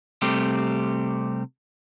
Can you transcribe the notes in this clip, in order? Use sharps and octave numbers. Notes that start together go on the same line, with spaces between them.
C3 G3 A3 C4 G4